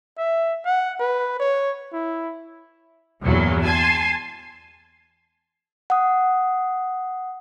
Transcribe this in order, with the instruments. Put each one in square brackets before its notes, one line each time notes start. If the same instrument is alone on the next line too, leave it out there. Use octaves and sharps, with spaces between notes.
[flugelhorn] E5
F#5
B4
C#5
E4
[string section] E2 G2 A#2 F#3
G#5 A5 C6
[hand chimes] F#5 D#6